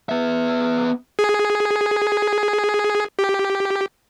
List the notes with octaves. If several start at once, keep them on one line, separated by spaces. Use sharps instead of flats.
B3 E5
G#4
G4